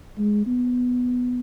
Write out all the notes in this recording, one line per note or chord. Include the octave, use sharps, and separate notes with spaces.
G#3
B3